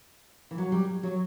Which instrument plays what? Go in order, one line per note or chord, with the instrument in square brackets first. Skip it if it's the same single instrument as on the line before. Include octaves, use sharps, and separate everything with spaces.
[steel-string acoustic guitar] E3
F#3
G3
F#3